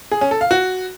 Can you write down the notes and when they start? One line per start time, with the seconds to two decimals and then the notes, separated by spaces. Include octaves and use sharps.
0.12 G#4
0.21 C#4
0.31 A4
0.41 F5
0.51 F#4